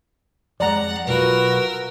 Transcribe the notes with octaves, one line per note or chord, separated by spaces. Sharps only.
F2 G#3 D5 F#5 A#5
B1 F4 F#4 A#4 B4 E6